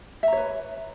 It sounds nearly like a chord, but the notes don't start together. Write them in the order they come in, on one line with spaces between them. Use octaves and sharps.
E5 A#5 C#5 B4